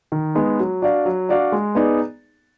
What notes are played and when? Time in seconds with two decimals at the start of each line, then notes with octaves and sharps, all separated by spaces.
0.12 D#3
0.35 G#3 B3 D#4
0.59 F#3
0.82 D4 F#4 D5 F5
1.05 F#3
1.29 D4 F#4 D5 F5
1.52 G#3
1.75 B3 D#4 G#4 D5